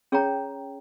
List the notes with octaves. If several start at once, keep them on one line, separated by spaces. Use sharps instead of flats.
C#4 G#4 C#5 G5 A#5